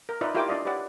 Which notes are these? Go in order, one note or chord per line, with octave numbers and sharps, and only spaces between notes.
A#4
D#4 F4 B4 D5 E5
E4 F4 G4 A#4 G5 D6
D4 F4 D5 D#5 F5
G4 B4 C#5 D5 F#5